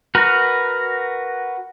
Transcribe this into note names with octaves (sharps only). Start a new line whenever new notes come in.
F#4 A#4 B4